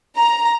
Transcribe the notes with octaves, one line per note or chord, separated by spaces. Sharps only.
A#5